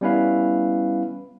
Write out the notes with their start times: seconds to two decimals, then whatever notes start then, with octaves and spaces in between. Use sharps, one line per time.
0.01 G3 B3 C#4 E4 B4 F5